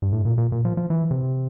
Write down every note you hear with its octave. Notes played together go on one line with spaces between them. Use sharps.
G2
A2
A#2
A#2
A#2
F3
F3
E3
C3